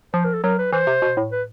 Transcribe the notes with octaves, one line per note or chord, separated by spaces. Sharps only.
F3 C5
A#4
A4
F#3 A#4
B4
E3 C5
C3
B2
A2
B4